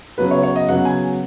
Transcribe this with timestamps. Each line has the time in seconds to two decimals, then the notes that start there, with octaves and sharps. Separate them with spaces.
0.18 C#3 F#3 B3 B4
0.31 C#5
0.43 C#5
0.56 D#5
0.68 C#3 F#3 B3 F#5
0.85 G#5